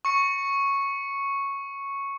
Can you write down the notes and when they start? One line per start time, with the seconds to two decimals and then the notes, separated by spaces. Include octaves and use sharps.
0.05 C#6 C#7